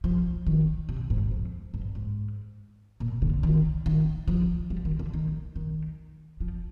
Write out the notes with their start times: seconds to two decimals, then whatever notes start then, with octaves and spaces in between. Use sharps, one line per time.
0.04 F3
0.47 D#3
0.89 C3
1.10 G#2
1.31 F2
1.74 G2
1.95 G#2
3.00 A#2
3.22 D3
3.43 D#3
3.86 D#3
4.28 F3
4.70 G3
4.85 D#3
4.99 D3
5.14 D#3
5.56 D#3
6.40 F3